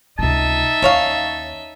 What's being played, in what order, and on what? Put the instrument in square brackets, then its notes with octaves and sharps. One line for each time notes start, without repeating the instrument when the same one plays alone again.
[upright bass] C#2 C3 [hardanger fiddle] D#4 E5 [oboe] A5
[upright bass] D#2 [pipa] C#4 C#5 F5